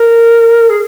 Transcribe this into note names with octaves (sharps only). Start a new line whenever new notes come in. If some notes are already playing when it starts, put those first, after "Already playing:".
Already playing: A#4
G#4